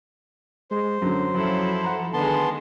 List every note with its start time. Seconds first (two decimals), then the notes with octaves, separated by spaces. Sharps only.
0.71 G#3 C5
1.02 F#2 D3 F#3
1.34 F#2 F3 E4 A4
1.84 F#5 A#5
2.14 D3 D#3 G#3 B3 A5 C6